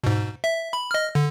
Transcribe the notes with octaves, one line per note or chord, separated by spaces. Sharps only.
G#2 B2
E5
B5
D#5 F6
D3